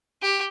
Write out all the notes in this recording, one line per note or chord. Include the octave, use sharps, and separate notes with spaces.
G4